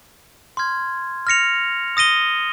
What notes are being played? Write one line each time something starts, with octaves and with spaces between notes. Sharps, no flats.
C6 F6 G#6
F6 A#6 C#7 F7
D#6 A#6 D#7 G7